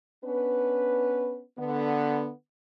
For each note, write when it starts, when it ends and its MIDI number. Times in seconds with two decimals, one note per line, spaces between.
0.24 1.43 59
0.24 1.43 61
0.24 1.43 62
0.24 1.43 71
1.58 2.29 50
1.58 2.29 59